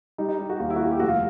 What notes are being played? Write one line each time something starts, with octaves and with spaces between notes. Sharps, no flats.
G3 D#4
D#4
G3
F#4
D#2 F4
E4
F#4
G3 F4
G4
F1 F#4
F4